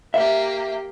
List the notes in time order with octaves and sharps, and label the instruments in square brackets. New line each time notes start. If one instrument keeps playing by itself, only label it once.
[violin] A#3 G4 [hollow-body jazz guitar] E5